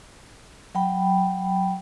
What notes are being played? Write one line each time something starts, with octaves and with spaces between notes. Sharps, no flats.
F#3 G5 B5